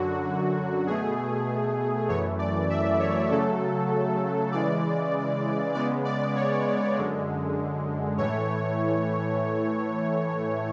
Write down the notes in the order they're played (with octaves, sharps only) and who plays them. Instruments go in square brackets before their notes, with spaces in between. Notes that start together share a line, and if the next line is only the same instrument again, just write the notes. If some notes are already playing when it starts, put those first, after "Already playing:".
Already playing: [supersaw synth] F#2 D3 F#3 F#4
B2 A3 G#4
F#2 E3 A3 C#5
D5
E5
C#5
C#3 F#3 A3 A4
C#3 E3 G#3 D5
C#3 G#3 B3 D5
D5
C#5
F#2 D3 G#3
A2 E3 A3 C#5